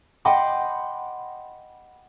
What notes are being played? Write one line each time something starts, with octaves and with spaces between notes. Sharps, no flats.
D#5 F#5 G5 B5 C6 D6